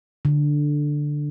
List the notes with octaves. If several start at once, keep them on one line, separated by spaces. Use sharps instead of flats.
D3